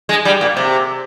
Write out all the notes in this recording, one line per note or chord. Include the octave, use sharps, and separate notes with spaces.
G#3
G3
A#2
C3